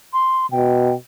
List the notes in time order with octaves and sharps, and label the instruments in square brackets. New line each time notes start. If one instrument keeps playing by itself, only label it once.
[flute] C6
[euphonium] B2 [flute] G5